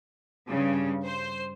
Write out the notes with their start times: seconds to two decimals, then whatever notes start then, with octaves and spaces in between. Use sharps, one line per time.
0.47 G2 C#3
1.05 C5